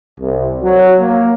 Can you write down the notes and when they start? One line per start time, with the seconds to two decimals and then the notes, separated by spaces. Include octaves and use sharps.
0.21 C2
0.63 F#3
1.00 A#3